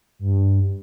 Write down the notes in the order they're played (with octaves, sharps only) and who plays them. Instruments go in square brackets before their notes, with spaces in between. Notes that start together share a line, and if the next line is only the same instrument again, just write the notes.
[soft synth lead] G2